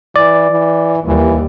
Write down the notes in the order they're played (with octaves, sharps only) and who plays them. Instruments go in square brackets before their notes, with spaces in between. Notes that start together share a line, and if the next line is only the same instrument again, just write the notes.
[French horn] E3 [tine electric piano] D5
[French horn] E3
[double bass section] D#2 G3 [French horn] E3